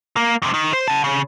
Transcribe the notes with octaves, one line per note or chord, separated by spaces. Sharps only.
A#3
F2 C3
D#3
C5
F#5 A5
C#3